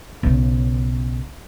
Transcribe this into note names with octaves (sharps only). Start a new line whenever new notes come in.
B1 C#3